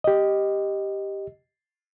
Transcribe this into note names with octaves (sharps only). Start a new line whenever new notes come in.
G4 D#5